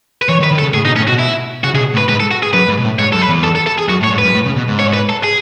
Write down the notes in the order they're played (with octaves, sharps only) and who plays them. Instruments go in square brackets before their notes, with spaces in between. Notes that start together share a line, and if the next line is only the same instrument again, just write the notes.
[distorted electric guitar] B4
[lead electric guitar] E3 [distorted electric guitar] C#5
[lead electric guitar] D#3
[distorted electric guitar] B4
[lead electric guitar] D#3
[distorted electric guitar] A4
[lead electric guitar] C#3
[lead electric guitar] A2 [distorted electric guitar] G#4
[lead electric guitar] B2 [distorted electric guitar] D#4
[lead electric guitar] A2 [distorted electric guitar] C#4
[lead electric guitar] B2 [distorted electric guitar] F#4
[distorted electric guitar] E4
[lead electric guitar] C#3 [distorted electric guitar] F#4
[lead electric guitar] C#3 [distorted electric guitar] G#4
[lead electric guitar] B2
A2
[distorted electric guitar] B4
[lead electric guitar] G#2 [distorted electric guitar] B4
[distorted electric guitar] A4
F#4
G#4
[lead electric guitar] F#2 [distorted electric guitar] B4
[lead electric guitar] G#2
B2
A2
[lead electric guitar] G#2 [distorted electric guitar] C#5
[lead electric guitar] F#2 [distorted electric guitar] A4
[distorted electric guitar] B4
[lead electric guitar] E2
[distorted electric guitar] A4
A4
A4
G#4
[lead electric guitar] F#2 [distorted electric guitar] F#4
[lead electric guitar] A2
[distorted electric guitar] C#5
[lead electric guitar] G#2
[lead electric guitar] F#2 [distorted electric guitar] B4
[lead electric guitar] A2
C#3
B2
G#2
[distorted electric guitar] C#5
B4
A4
G#4